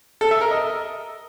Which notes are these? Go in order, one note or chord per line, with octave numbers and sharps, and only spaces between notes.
A4
E5
A#4
D#5